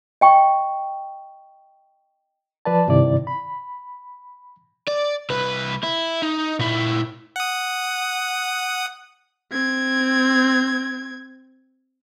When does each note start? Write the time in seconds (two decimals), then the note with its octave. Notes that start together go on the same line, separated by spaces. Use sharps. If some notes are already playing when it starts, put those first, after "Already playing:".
0.21 D#5 G5 C#6
2.65 F3 B4 D5 A5
2.88 G2 C3 D#3 E4 D5
3.27 B5
4.88 D5
5.30 C2 B4
5.83 E4
6.23 D#4
6.59 A#2 E4
7.36 F#5 D#6
9.51 C4 G#6